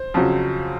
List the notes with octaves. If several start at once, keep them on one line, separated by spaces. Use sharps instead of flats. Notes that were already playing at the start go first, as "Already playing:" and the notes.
Already playing: C5
F2 C#3 F#3